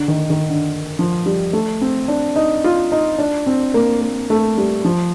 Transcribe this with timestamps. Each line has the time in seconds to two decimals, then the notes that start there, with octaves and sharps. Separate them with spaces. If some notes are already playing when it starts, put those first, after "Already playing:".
Already playing: D3
0.08 D#3
0.30 D#3
0.49 D3
0.99 F3
1.26 G3
1.53 A3
1.81 C4
2.08 D4
2.36 D#4
2.64 F4
2.92 D#4
3.19 D4
3.47 C4
3.74 A#3
4.01 A#3
4.30 A3
4.57 G3
4.85 F3